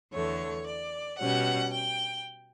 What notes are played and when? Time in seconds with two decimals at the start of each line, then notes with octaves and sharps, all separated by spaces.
0.12 E2 D3 A3 C#5
0.66 D5
1.19 B2 G3 C#4 F#5
1.72 G5